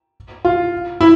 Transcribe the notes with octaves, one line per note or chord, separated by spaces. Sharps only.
F4
E4